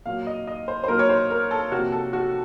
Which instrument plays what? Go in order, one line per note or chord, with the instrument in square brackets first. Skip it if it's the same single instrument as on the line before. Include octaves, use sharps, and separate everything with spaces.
[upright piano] A#2 F#3 A#3 F5
D#5
D#5
C5
C5
A#2 F#3 A#3 A#4
C#5
C5
A#4
A4
C3 F3 A#3 F#4
A4
F#4